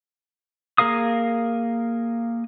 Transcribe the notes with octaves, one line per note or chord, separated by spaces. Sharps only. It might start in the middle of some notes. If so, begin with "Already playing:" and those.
A#3 G#4 A#4 F5 D#6